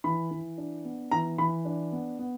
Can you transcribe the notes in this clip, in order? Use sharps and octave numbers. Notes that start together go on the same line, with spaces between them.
E3 B5
E3
D4
B3
E3 A#5
E3 B5
D4
B3
B3